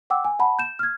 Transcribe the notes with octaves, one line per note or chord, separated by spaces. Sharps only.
F#5 G5 D6 E6
G#5
F#5 A5 B5
G6 E7
F6 G#6